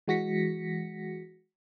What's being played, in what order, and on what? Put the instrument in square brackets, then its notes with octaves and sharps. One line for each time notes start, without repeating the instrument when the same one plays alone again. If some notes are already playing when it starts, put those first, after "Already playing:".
[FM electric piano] E3 G#3 F#4 A#6 B6 C#7